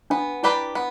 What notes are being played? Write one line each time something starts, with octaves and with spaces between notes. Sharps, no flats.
B3 D4
D4 E4 G4 B4 D5
B3